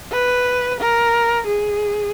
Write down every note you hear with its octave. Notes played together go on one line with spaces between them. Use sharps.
B4
A#4
G#4